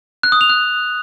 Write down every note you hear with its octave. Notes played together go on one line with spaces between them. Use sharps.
F#6
D#6
F7
F#6